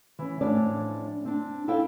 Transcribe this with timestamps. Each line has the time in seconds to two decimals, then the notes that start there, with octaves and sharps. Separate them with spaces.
0.19 E3 C#4
0.41 A2 F3 C#4 D4 D5
1.25 C4 D4
1.68 E4 A4 F5 G5